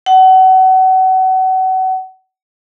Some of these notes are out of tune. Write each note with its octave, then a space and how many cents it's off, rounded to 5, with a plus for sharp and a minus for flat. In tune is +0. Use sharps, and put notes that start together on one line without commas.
F#5 +30